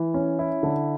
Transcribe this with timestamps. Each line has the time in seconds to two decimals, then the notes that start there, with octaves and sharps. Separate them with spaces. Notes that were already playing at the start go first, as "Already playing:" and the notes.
Already playing: E3
0.14 C#4
0.39 E4
0.63 D3